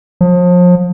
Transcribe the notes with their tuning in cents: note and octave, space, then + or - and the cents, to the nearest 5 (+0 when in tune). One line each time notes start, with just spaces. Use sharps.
F3 +35